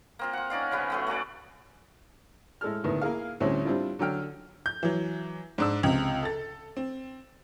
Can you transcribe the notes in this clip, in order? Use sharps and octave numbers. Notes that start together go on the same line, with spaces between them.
A#3 C4 F4
F4 F#5
C#4 D#4 D5 F5
C#3 F3 B3 B4
F#3 A3 B3
A3 F#4 G#4 D5
A2 G#3 A4 F6
D2 A2 D#3 B3
A#3 E4 G#4 F5
D2 A2 G3 C4 C#4
G3 C4 D4 E4 F4
D3 F#3 A4 G5 F6
G6
E3 F#3
G#2 D4 E6
C#2 C3
A4 A6
C4